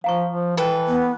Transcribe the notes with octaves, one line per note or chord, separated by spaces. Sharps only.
F3 F5 A#5 C#6
F3
E3 A4 B4 G5
B3